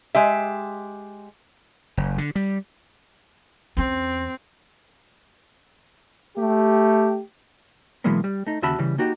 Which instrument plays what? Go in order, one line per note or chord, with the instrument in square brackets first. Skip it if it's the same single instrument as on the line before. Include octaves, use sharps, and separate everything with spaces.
[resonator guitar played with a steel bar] G#3 G4 E5
[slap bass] F#1
D3
G3
[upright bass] E2 C#4 [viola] C4
[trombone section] A3 G4
[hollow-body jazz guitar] B2 E3 F#3 G#3 A#3 B3
G3
A3 D#4
D#2 C#3 F#4 E5 A5 B5
C#3 E3 G3
A#3 D#4 F#4 G4